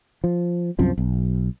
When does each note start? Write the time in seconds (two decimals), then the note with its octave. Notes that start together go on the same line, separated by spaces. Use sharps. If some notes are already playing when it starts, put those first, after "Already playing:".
0.24 F3
0.79 C2 F#2 F3 C4
0.98 B1